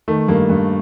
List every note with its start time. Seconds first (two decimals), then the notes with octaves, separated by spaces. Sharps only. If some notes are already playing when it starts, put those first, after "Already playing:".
0.08 D#3 A3
0.28 G2 A#3
0.49 G2